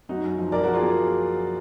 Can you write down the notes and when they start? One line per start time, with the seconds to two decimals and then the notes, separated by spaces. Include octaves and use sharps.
0.09 F#2 D#4 F#4
0.24 F#2
0.38 F3
0.52 F#2 A#4 D5
0.63 F#4 A#4
0.67 F3
0.74 F4 G#4
0.82 A#3